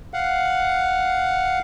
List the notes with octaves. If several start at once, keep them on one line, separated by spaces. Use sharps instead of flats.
F5 F#5